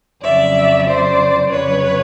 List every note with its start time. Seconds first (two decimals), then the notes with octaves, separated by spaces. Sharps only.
0.23 F2 C#3 F#3 D5 E5
0.87 C5 D5
1.50 F2 C#3 F#3 B4 C#5